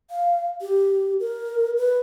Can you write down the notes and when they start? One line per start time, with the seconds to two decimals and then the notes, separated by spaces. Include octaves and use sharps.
0.11 F5
0.61 G4
1.20 A#4
1.77 B4